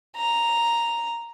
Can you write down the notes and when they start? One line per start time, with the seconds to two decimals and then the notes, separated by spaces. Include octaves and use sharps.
0.17 A#5